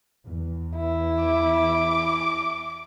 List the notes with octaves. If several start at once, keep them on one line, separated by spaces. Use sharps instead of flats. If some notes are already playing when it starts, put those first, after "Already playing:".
E2
E4
D6